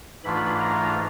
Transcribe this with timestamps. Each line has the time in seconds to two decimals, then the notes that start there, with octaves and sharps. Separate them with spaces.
0.24 G#2 E3 A3 D4 F4 B5
0.61 A#5